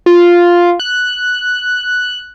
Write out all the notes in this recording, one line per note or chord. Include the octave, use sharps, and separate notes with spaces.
F4
F#6